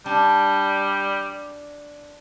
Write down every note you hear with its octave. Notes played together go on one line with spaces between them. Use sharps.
G3 D4